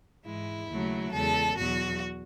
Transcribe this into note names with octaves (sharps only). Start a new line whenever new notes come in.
G#2 E3 G#3 E4
D#2 C#3 F#3 A3
E2 C#3 G#3 A4
E2 B2 F#3 F#4